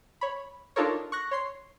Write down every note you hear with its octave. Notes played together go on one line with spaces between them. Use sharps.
C#5 B5
D4 D#4 F4 A4 A#4 C#5
C#6 F#6 A#6
C#5 C6 C7